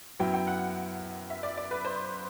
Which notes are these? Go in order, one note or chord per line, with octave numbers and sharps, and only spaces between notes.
F#2 F#3 B3 E4 G5
G5
F#5
E5
D5
D5
B4
C5